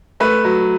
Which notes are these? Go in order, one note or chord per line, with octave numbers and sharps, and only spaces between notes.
A3 B4
F#3